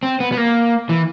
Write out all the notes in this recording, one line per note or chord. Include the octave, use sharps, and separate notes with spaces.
C4
B3
B3
A#3
E3